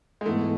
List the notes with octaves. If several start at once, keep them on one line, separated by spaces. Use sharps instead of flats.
G#3
G#2 E3 A3 B3